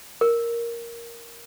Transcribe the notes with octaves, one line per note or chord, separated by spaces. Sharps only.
A#4